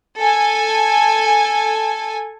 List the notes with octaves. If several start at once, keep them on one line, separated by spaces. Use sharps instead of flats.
A4 G#5